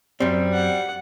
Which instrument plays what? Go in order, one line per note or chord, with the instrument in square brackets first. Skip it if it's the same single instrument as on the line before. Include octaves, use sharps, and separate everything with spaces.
[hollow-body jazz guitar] F#2 C4 [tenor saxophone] G3
[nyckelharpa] F#5